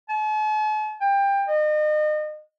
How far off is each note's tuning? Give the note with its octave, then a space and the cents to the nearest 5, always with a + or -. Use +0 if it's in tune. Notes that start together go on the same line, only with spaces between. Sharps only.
A5 -45
G5 +20
D#5 -35